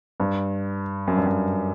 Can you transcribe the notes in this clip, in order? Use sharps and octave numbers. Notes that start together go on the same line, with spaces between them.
G2
F#2
G2
F#2